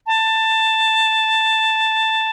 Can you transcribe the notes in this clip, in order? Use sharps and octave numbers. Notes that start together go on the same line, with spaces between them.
A5